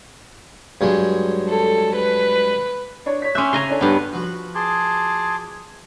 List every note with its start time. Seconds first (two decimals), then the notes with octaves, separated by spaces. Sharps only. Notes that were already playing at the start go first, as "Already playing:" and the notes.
0.81 G2 F#3 G#3
1.49 A4
1.96 B4
3.06 D4 C#5 C#6
3.22 C#5 B6
3.35 C#4 E5 C6 D6 F#6
3.53 C#3 G#5 A#5 C6
3.69 C#4 D4 A4
3.81 G2 B3
4.13 F3 F#4 B4
4.55 G#4 A5 C6 D6